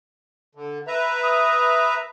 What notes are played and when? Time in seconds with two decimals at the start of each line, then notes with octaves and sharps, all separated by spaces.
0.55 D3
0.88 B4 E5 A#5
1.23 D#6